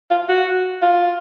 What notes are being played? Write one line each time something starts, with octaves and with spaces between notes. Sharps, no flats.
F4
F#4
F4